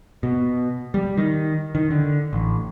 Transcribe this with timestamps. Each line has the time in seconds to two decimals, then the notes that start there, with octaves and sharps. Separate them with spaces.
0.23 B2
0.94 G3
1.17 D#3
1.75 D#3
1.91 D3
2.33 A1